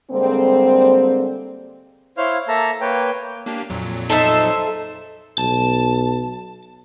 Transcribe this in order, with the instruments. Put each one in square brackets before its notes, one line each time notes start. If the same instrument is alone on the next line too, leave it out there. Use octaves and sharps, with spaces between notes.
[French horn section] D3 G3 G#3 A#3 C4
[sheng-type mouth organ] E4 C5 C#5 F5 F6
A#3 A4 E5 A5 A#5
A#3 B4 C#5 G5
[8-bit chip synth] A#3 D4 G4
F2 A#2 F#3
[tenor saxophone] D#4 [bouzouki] A4 C5 E5
[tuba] B1 [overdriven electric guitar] A5